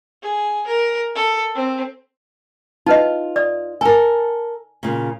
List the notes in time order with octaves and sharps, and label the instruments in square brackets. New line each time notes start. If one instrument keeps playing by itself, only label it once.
[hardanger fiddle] G#4
A#4
A4
C4
[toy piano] D#4 B4 D#5 [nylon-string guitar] F4
[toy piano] D5 D#6
[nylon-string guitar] A4 A#4 [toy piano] G#5
[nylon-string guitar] A#2 C#3